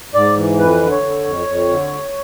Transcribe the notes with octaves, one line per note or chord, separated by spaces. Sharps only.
G#2 D5
E3
F2 B4
D3
C#5
D3
F2
F2
D3